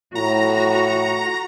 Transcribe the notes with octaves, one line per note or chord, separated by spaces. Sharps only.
A2 F#4 A#5